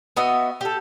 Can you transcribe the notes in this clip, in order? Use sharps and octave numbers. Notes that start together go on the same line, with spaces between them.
B3 F#4 D#5 E5
G4 A4